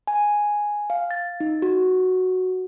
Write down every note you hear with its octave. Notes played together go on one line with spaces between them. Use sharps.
G#5
F5
A6
D#4
F#4